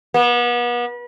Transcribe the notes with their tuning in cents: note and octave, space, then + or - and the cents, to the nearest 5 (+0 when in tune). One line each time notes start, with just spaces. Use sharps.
B3 -35